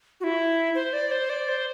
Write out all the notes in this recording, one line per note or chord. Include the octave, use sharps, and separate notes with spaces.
F#4
E4
C5
D5
C5
D5
C5